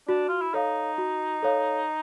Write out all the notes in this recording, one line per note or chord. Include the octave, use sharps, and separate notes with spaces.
D4 F#4
F4
E4
D#4 A4 C#5 F5
F#4
A4 C#5 F5